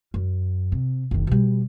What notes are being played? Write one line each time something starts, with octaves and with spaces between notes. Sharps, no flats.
F#2
C3
F#1 D#3
B2 G3